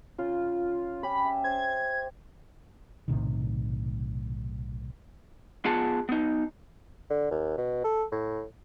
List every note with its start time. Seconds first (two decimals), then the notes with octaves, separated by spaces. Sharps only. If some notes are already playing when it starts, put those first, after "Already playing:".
0.18 C#3 F4
1.03 C#4 G4 B5
1.25 E5
1.44 C5 G#6
3.08 B1 A2 C3 D#3
5.65 B3 F4 G#4 F#5 A5
6.09 B3 D#4
7.10 D3
7.31 D#2
7.57 B2
7.85 A4
8.12 A2